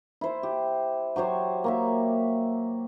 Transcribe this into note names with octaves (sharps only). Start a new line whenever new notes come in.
E4 C5
G4
F#3 G4 C5 C#5
A#3 C#5 E5